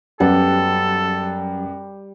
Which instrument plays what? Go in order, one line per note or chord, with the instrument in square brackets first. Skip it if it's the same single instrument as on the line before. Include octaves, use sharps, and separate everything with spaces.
[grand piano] F#2 B3 F#5 [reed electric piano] F#3 C#4 G4 [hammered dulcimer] G3 [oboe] A4